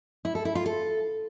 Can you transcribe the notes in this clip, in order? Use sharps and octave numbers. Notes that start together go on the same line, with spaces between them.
E4
A4
E4
F4
A4